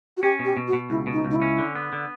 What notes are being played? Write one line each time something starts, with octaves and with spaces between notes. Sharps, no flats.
F#4
C#4 G4
B2
G4
B2
F#4
B2
C#2 E4
B2
D#4
C#2
D#4
E4
C#4
D3
B3
D3